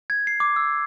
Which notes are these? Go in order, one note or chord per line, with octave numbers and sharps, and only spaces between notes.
G#6
C7
D6
E6